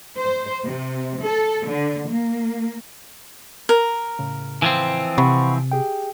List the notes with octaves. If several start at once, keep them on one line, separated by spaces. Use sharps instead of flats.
C5
C3
A4
D3
A#3
A#4
A2 C#3
E3 F3 C4
C3 F#5 B5 C#6
G4 G#4 G5